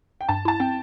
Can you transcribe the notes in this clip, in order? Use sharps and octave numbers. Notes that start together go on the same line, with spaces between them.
G5
G2 A5
E4 A5
C4 G5